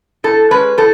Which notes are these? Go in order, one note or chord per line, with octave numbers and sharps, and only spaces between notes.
A2 A4
G#3 C#4 B4
A2 A4